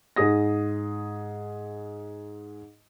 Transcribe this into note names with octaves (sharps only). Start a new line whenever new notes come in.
G#2 G#4 D#6 A#6